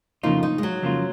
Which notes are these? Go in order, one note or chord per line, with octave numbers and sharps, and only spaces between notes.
F2 C#3 F3 A#3 D#4 F4
D#4
G#3
F#3
F2 C#3 F3 A#3 F4